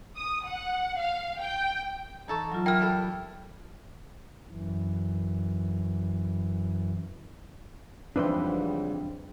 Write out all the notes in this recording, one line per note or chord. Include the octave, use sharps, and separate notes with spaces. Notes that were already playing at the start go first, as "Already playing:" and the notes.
D#6
F#5
F5
G5
E3 D#4 A4 A5 A#5 C#6
A2 F#3 F4
E4 A#4 G5 F6
G3 G4 A4
F#2 E3
F2 G#2 C#3 E3 G3 D4 B4 C5